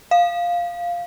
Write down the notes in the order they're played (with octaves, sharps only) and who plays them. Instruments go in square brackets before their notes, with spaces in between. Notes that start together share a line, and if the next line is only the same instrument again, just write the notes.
[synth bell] F5